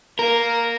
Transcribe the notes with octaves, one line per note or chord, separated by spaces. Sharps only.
A#3 A#4